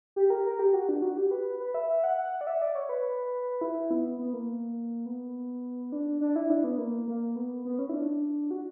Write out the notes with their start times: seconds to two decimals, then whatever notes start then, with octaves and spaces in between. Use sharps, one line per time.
0.16 G4
0.30 A#4
0.46 A#4
0.59 G4
0.74 F#4
0.89 D4
1.02 F#4
1.17 G4
1.31 B4
1.60 B4
1.74 E5
1.89 E5
2.04 F#5
2.18 F#5
2.41 D5
2.47 E5
2.62 D5
2.75 C#5
2.89 B4
3.61 E4
3.91 B3
4.19 B3
4.33 A#3
5.06 B3
5.92 D4
6.21 D4
6.36 E4
6.50 D4
6.64 B3
6.78 A#3
7.08 A#3
7.36 B3
7.65 B3
7.79 C#4
7.89 E4
7.94 D4
8.51 F#4